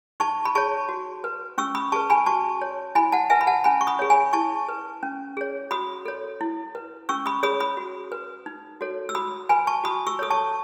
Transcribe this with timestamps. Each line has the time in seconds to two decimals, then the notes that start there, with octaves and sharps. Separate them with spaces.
0.20 D#4 A5 C#6
0.45 B5
0.55 G#4 C#5 A5 C#6
0.89 F#4
1.24 B4
1.58 C#4 C#6 E6
1.75 B5 D#6
1.92 G#4 B4 A5 C#6
2.10 G#5 B5
2.26 F#4 A5 C#6
2.62 C#5
2.95 E4 G#5 B5
3.12 F#5 A5
3.30 B4 E5 G#5
3.41 B5
3.47 F#5 A5
3.64 C#4 G#5 B5
3.81 C#6
3.87 B5 D#6
3.99 G#4 C#5
4.10 G#5 B5
4.33 E4 A5 C#6
4.69 B4
5.03 C#4
5.37 G#4 C#5
5.71 F#4 B5 D#6
6.05 A4 C#5
6.41 E4
6.75 B4
7.09 C#4 C#6 E6
7.26 B5 D#6
7.43 G#4 C#5 B5 D#6
7.60 B5 D#6
7.77 F#4
8.12 B4
8.46 D#4
8.81 F#4 A4 C#5
9.09 E6
9.15 F#4 B5 D#6
9.49 B4 G#5 B5
9.67 A5 C#6
9.84 F#4 B5 D#6
10.07 C#6 E6
10.19 A4 C#5 D#6
10.30 A5 C#6